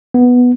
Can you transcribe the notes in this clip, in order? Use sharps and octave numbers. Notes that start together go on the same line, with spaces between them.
B3